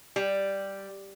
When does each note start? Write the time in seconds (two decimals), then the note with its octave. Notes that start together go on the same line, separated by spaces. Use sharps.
0.16 G3